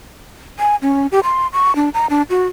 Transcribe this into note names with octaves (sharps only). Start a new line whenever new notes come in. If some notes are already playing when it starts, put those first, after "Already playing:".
G#5
C#4
G4
C6
C#6
D4
A#5
D4
F#4